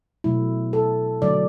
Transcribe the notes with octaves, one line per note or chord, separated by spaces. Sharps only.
B2 F#3 A3 E4
A4
D3 F#3 A3 D5